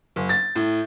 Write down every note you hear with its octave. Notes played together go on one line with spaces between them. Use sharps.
F#1
A6
A2